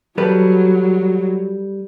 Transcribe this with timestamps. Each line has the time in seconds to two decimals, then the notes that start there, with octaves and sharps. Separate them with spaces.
0.18 F#3 G3 A4 B4